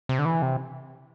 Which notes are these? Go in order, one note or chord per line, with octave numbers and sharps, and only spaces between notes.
C3
D3
E3
C3